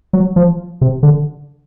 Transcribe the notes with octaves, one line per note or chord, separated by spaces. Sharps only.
F#3
F3
C3
D3